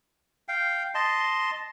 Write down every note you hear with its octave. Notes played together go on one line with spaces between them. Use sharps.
F5 G5
D#5 A5 C6